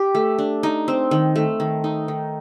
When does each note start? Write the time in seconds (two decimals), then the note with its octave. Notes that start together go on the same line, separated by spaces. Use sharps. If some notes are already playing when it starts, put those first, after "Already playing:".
Already playing: G4
0.15 A3
0.38 D4
0.63 D#4
0.88 C4
1.11 D#3
1.36 A3
1.60 D#3
1.84 D#4
2.08 D#3